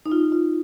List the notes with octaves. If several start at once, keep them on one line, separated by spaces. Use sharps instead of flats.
D#4
F4
F4